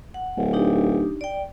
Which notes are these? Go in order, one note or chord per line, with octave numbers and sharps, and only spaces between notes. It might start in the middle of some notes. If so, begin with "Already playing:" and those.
F#5
D1
D4 D#4 G4
D5 G5